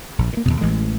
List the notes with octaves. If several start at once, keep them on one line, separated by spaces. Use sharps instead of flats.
A#1
A#2 A#3
D#2 G#2 B2
A1 A2 E3 G#3